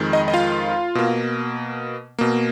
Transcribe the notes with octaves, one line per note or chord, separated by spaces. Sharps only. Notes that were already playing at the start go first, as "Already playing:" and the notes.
Already playing: F2 D#3 G#3
D#4 D#5
D#5
F4 F5
B2 A#3
B2 A#3